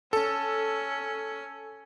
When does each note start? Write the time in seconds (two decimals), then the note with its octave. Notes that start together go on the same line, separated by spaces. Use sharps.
0.13 C#4 A4